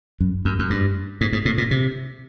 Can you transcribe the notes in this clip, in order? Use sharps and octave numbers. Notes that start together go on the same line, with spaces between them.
F#2
F#2
F#2
G2
G#2
G#2
A2
A#2
C3